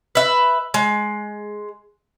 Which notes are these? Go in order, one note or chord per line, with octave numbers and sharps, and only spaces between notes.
B4 E5
G#3